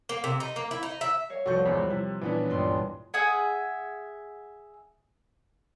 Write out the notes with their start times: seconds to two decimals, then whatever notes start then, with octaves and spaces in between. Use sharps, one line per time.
0.09 A#3
0.24 C3
0.40 D#4
0.56 A#3
0.71 E4
0.83 D#4
1.01 E5
1.29 A#4 C#5 F5
1.46 F1 C2 F#4 A4 C#6 G6
1.65 E2 G#2 B5 F#6
1.90 C3 E4
2.21 A#2 E3 B3 C#4 D4 E4
2.50 C#2 G2 C6
3.14 G#4 E5 F#5 G#5